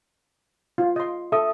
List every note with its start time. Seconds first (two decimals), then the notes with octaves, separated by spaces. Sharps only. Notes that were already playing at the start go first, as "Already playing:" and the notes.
0.78 F4
0.96 D#5 C6
1.32 A4 E5 D#6